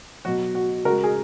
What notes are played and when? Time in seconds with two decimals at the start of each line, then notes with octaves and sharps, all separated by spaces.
0.25 B2 F#3 F#4
0.55 F#4
0.85 C#3 F#4 A#4
0.90 G#3
1.04 G#4